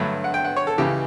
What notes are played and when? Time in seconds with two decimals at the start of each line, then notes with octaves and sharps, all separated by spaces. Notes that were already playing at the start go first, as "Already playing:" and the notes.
Already playing: G2 D3 F#3 A3 B5
0.24 F#5
0.34 G5
0.44 F#5
0.57 C#5
0.67 A4
0.78 C#2 C#3 E3 G4